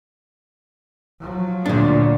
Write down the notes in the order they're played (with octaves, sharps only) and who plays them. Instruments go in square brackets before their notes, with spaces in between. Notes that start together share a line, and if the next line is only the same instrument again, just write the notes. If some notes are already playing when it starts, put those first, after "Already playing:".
[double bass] F3 F#3
[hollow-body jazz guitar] D2 D4 [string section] A#2